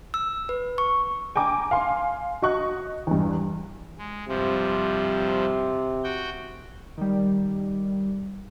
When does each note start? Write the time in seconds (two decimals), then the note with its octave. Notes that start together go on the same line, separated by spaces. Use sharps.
0.14 E6
0.49 B4
0.78 C#6
1.36 G5 G#5 A#5 D6
1.71 F5 G#5 C6
2.42 F#4 D#5 C#6 F#6
3.07 E2 G2
3.98 G#3
4.29 G2 C3 F3
6.04 F#4 G5
6.97 D#3 G3